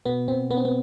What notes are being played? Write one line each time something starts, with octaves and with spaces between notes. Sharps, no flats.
B2 B3
B2 C4
B2 B3
C4
B3